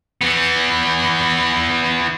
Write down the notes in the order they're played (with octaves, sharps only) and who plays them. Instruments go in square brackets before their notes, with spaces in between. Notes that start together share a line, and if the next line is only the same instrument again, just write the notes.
[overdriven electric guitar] E3 B3